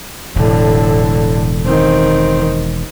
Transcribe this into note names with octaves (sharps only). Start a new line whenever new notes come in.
E1 A2 D3
D#3 C4